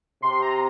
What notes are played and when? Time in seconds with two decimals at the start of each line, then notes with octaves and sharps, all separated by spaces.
0.22 C3 C6
0.42 A#5